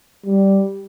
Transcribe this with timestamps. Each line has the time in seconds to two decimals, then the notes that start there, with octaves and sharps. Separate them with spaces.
0.25 G3